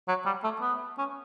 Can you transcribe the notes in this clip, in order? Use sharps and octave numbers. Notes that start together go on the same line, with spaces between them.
F#3
G3
A3
B3
C#4